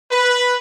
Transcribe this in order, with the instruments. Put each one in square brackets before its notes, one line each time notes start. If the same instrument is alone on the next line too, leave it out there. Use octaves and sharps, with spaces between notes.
[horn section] B4